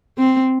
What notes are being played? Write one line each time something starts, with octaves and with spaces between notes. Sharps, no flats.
C4